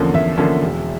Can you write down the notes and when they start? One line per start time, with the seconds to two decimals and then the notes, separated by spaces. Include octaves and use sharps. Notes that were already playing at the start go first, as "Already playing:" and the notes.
Already playing: E2 D3 F3 A#3 C#4
0.14 E2 E5
0.38 D3 F3 A#3 C#4
0.62 E1